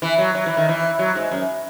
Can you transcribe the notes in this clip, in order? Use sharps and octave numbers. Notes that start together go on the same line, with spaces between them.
E3
F#3
F#3
E3
D#3
E3
F#3
G#2
F#2